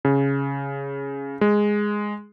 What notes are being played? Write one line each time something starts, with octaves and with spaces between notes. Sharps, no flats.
C#3
G#3